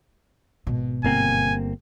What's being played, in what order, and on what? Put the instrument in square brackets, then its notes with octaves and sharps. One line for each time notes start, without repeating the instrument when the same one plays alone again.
[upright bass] G#1 B2
[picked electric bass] G1 A#3 C4 [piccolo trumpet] G#5